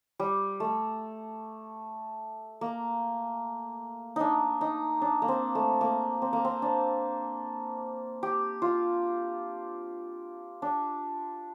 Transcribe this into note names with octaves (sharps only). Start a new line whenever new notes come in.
G3
A3
A#3
D4 D#4
D#4
D4
A#3
C4
A3
A#3
C4
A#3
C4
D4
G4
F4
D4